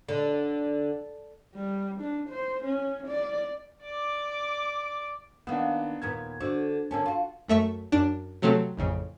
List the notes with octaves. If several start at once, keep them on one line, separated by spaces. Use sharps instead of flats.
D3
G3
D4
C5
C#4
D5
D5 D6
D#3 A#3 B3 D4 F#5
D#2 A#2 B3 G#6
D3 D4 F#4 C5
D3 A#3 C#4 A5
F4 F#4
F#2 A3 E5 C#6
F#2 D4 D7
C3 F#3 A3 C4 A4
A1 F2 C#3